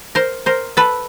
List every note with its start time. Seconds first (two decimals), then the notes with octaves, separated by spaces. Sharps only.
0.15 A#4 C5
0.46 A#4 C5
0.77 A4 B4